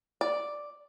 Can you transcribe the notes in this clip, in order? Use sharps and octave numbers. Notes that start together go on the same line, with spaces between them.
D5